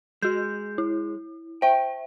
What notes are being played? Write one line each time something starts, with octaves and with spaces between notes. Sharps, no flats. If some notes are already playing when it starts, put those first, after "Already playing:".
G#3 F#4 G6
E4
C5 E5 G5